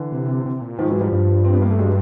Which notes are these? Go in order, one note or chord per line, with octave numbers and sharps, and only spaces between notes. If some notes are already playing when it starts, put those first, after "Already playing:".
Already playing: D3 E3
C3
C3
A#2
G#2 D#3 F3
E3 F#3
F3 G3
G2
C4
B3
A#3
A3
F#3 G#3